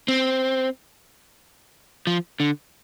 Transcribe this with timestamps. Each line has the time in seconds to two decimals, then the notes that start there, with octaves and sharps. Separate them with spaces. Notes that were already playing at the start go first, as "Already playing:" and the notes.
0.08 C4
2.07 F3
2.40 D3